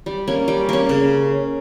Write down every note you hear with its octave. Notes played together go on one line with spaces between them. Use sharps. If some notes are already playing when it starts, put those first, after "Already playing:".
G3
A#3 C#4
G3
A#3 C#4
C#3